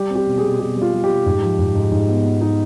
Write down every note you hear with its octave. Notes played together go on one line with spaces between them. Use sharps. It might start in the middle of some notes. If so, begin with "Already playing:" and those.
Already playing: G3 G4
C4
G4
B2
G#4
B2
B2 G4
G3
F4
G3
G4
G3
G#2
F3
G#2
G#2
G#2
B3
B3
D#4